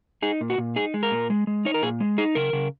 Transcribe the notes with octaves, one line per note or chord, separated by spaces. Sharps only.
D#4 G#4
A#2
F#4
A#2
D#4 G#4
G#3
A#4
A#2
G#3
G#3
D#4 C#5
A#4
A#2 G#4
G#3
D#4 G#4
C#3 A#4
C#3